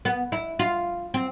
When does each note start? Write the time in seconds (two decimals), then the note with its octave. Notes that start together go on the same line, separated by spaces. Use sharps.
0.05 B3
0.32 E4
0.59 F4
1.14 C4